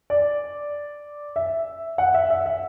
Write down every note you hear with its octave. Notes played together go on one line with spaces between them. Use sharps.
D5
E5
F#5
E5
E5
E5